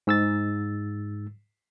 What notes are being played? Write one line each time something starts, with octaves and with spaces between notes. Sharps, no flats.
G#2 E6 A6